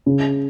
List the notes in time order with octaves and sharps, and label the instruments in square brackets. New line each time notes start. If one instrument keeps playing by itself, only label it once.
[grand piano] C#3